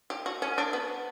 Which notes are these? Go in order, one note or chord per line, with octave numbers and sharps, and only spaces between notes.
G4
F#4
C#4
D4
B3